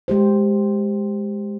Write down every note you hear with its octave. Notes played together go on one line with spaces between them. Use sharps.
G#3 G4 C5